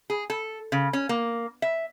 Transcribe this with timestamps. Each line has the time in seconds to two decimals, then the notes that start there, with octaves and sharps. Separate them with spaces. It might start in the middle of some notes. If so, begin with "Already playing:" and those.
0.10 G#4
0.30 A4
0.72 C#3
0.93 C#4
1.09 A#3
1.62 E5